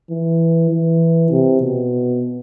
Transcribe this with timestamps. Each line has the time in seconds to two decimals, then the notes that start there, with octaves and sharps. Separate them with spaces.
0.11 E3
0.71 E3
1.30 C3
1.61 B2